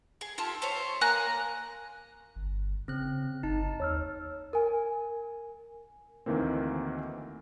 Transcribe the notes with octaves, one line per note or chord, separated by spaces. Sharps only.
G#4
F4 G4 A4
A3 C5 C#5
A#3 G#5 A#5 F#6
G1
C#3 C4 F#6
G1 D#4 A5
D#2 C#5 E6 F6
A#4 G#5
D2 D#3 E3 A#3 C4